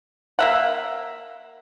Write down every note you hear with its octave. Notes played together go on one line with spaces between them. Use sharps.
A#3 E5 F#5